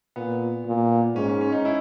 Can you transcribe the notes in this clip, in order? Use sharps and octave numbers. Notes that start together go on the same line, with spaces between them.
A#2 B3
A#2
G#2 C#4
C#4
C#4
D#4
E4